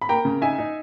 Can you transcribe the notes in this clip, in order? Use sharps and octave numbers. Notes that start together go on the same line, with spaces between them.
B5
A#3 G5 A#5
C#3
D#4 E5 G#5
D#4